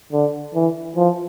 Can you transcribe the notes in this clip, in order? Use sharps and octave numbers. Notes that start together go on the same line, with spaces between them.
D3
E3
F3